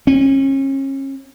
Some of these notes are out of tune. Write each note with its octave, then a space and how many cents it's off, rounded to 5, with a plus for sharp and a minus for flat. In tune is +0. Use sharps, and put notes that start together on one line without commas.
C#4 -35